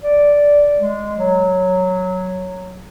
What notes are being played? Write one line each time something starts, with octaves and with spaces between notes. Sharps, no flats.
D5
G#3
F#3